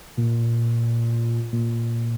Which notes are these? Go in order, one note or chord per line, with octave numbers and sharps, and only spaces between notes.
A#2
A#2